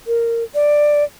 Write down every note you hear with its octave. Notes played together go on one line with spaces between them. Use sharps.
A#4
D5